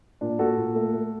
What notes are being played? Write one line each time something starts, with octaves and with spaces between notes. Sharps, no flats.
A#2 D4
A#2 F#4 A4
A#2
A3
A3